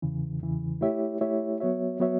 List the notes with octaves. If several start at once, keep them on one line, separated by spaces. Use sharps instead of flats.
E2 C#3 E3
E2 C#3 E3
A3 E4 G4 C#5 E5
A3 E4 G4 C#5 E5
F#3 B3 F#4 C#5 E5
F#3 B3 F#4 C#5 E5